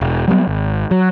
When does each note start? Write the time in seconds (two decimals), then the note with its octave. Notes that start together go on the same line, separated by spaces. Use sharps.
0.01 E1
0.28 F#3 G3 A3 B3
0.47 G#1
0.91 F#3